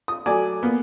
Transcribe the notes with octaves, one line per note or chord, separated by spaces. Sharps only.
D#6
F#3 A3 D5 G#5
A#3 B3